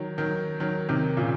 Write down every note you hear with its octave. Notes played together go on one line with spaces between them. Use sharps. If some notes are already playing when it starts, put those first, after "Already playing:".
Already playing: D#3 F#3
D#3 F#3
D#3 F#3
C3 D#3
A#2 C#3